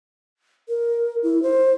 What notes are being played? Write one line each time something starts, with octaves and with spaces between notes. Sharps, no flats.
A#4
E4
C5